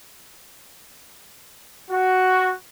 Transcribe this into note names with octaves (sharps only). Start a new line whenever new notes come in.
F#4